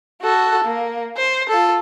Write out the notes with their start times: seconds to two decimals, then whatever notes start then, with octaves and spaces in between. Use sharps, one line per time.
0.22 F#4 A4
0.64 A#3
1.17 C5
1.49 F4 A4